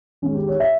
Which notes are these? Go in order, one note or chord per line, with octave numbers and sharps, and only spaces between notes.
G#1 G#2 D#3 G#3 C#4
G4
C#5
E5